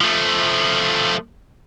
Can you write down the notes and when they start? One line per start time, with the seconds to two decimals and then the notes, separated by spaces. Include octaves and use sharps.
0.01 F3 A3